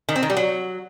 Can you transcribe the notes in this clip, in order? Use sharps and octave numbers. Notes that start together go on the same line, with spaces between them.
D#3
C4
D#3
G3
F#3